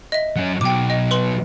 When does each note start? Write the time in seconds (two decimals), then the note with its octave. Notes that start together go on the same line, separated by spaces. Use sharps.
0.12 D#5 E5
0.36 F#3 C#4
0.61 B2 F#3 G5 D6
0.90 D#5
1.11 B4 C6 F#7